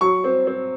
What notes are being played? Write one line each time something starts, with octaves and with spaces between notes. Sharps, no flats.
F#3 C#6
C4
C4